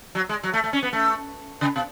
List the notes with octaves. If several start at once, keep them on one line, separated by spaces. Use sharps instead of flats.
F#3
G#3
F#3
A3
A3
C#4
B3
A3
C#3
B2